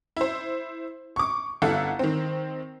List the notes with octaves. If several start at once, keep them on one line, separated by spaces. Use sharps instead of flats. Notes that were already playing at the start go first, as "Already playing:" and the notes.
E4 C5
C#6 D6
G1 E4 A4 F5 F#5
D#3 C4